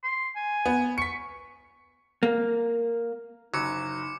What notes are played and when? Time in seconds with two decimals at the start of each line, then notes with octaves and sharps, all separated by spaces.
0.03 C6
0.36 G#5
0.66 B3
0.98 C#6 B6 C#7
2.23 A#3
3.54 F#1 F#3 D#4 D6 C#7